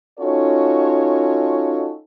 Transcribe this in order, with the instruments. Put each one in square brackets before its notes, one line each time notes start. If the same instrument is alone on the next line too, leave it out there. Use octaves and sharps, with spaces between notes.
[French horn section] C#4 D#4 F4 F#4 A4 C#5